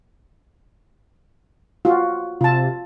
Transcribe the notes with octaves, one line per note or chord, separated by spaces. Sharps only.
F4 F#4
C3 F4 A5